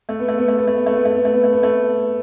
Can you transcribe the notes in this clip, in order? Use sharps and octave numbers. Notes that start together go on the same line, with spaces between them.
A3
B3
A3
B3
A3
B3
A3
B3
A3
B3
A3
B3
A3
B3
A3
B3
A3